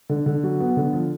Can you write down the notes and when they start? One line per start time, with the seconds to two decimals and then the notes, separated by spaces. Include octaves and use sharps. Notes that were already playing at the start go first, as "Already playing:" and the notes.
0.09 D3
0.26 D3
0.43 F#3
0.60 B3
0.77 D3
0.93 F3